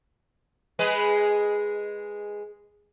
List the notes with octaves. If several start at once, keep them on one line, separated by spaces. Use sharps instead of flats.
G#3 G#4 B4